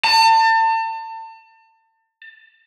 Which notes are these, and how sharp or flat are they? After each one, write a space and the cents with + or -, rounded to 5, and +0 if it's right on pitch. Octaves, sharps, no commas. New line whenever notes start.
A5 +35